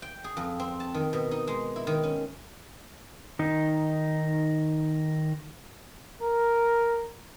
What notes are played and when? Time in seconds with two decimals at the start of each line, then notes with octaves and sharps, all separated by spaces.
0.02 G5
0.24 G#4
0.37 F2
0.60 C4
0.80 A5
0.94 D#3
1.13 B2
1.31 D#4
1.47 G#3
1.76 E4
1.87 D#3
2.03 C#4
3.39 D#3 D#4
6.21 A#4